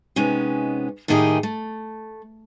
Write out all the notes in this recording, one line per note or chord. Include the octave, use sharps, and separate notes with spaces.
C3 G#3 B3 C#4 D#4
A2 D#3 A#3 D#4 G4 G#4
A3